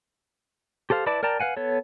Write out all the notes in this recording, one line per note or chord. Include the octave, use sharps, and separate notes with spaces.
G4 A4 C5 F5
E4 B4 D5 A5 D6
A#4 D5 G5 A5 A#5
B4 F5 F#5 G#5
B3 A4 C#5